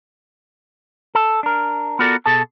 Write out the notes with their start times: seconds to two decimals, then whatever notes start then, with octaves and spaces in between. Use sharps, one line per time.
1.15 A4
1.43 D4 A#4
1.99 B3 F4 F#4 A4 A#4 D5
2.26 B2 G#4 A4 A5